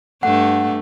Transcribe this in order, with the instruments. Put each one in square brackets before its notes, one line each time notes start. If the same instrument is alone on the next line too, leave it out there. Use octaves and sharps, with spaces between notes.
[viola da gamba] G2 A3 [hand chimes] F#5